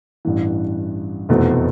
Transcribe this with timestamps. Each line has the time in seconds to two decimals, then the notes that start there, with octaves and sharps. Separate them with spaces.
0.25 A1 G2 E3
1.29 F1 E2 B2 A3 C4